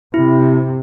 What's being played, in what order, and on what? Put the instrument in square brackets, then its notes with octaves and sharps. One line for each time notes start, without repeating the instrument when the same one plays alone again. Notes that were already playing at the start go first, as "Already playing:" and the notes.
[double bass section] C3 [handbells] E4